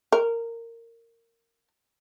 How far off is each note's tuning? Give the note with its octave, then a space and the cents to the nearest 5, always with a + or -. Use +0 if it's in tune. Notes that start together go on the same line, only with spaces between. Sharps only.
A#4 -15